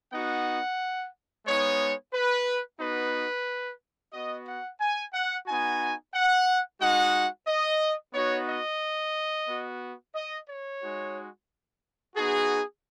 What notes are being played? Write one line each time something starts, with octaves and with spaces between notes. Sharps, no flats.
B3 D#4 F#4 F#5
G#3 B3 D#4 C#5
B4
B3 D#4 F#4 B4
B3 F#4 D#5
F#5
G#5
F#5
B3 D#4 F#4 G#5
F#5
G#3 D#4 F#4 F#5
D#5
B3 D#4 F#4 C#5
D#5
B3 F#4
D#5
C#5
G#3 D#4 F#4
B3 D#4 F#4 G#4